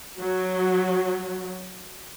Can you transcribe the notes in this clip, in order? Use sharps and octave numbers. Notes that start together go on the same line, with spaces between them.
F#3